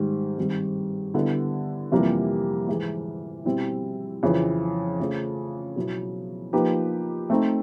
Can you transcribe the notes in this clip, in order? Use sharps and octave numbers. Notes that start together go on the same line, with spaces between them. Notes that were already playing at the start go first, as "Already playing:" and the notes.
Already playing: G#2 D#3 G3
G2 D#3 G3 C4
D3 G3 B3 E4 A4
F2 C3 E3 G3 A#3
G#2 E3 G#3
B2 G3 C4 E4
F2 C#3 E3
C#3 F3 A3
B2 F#3 B3 E4
F3 A#3 D#4 G4 B4
A3 C4 D#4